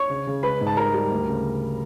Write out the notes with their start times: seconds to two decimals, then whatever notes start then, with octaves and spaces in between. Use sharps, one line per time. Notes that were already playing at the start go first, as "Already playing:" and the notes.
Already playing: C#5 C#6
0.10 C#3
0.27 C#3
0.43 G#3 B4 B5
0.61 G#2
0.67 A5
0.77 G3 A#4 A#5
0.94 G3
1.11 D2
1.28 C#3